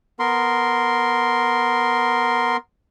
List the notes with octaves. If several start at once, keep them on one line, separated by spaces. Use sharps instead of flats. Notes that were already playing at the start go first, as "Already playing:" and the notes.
B3 A#4 C6